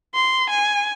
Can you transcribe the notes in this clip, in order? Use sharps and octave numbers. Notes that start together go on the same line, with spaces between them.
C6
G#5